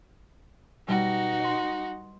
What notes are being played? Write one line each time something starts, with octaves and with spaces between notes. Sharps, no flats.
B2 G3 D#4 F#4
D#5 C6